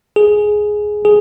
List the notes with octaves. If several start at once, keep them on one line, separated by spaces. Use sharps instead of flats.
G#4
G#4